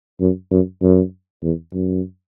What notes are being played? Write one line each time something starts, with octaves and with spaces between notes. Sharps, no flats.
F#2
F#2
F#2
E2
F#2